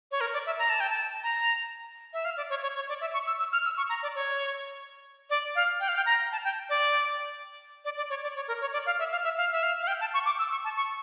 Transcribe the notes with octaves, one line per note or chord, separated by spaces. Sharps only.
C#5
A#4
D5
E5
A#5
A5
G5
A5
A#5
E5
F5
D5
C#5
C#5
C#5
D5
E5
C#6
E6
E6
F6
E6
C#6
A#5
D5
C#5
D5
F5
G5
F5
G5
A#5
A5
G5
D5
D5
D5
C#5
D5
C#5
A#4
C#5
D5
F5
E5
F5
E5
F5
E5
F5
F5
G5
A5
C#6
D6
E6
C#6
A5
C#6